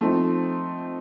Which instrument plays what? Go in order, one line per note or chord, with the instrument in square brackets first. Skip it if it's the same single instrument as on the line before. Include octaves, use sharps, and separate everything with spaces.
[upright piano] F3 A3 C4 D#4